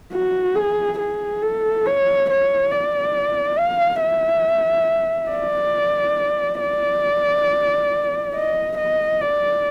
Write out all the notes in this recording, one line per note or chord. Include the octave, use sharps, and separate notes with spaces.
F#4
G#4
G#4
A4
C#5
C#5
D5
F5
E5
D5
D5
D#5
D#5
D5